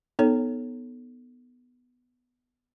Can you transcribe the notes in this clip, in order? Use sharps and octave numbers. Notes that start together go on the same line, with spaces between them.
B3 D#4 A4 C#5